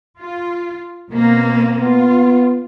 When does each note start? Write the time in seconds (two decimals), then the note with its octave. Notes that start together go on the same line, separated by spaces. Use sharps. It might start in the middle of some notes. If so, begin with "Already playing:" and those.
0.19 F4
1.11 B2 A#3 C4
1.81 B3 F4